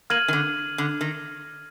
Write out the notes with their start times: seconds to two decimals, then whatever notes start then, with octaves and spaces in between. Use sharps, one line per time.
0.10 A#3 F6 G#6 D#7 F#7
0.28 D#3
0.33 D3
0.78 D3
1.01 D#3